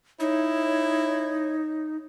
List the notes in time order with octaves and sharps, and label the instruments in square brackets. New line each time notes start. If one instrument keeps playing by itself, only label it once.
[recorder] D#4 [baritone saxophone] E4 [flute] C#5